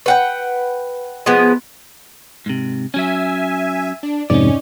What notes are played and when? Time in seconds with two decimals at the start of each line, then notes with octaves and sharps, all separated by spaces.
0.06 B4 F#5 G5
1.26 F3 G#3 B3
2.46 G#2 C3
2.94 F#3 C#4 E5 G#5
4.03 D4
4.30 F2 G#2 C3 C#4 D#4 D5